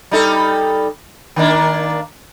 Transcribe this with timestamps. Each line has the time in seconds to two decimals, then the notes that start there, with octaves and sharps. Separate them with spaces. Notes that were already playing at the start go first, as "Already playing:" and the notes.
0.11 G3 D#4 A4
1.36 D#3 A#3 D4